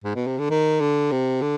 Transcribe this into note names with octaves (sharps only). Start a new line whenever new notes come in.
G#2
B2
C3
D3
D#3
D3
C3
D3